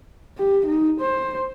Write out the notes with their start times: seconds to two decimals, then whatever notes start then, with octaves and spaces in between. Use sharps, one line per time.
0.38 G4
0.66 D#4
1.00 C5